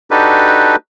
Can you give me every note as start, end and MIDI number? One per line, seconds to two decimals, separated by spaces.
0.11 0.76 62
0.11 0.76 63
0.11 0.76 66
0.11 0.76 67
0.11 0.76 69
0.11 0.76 71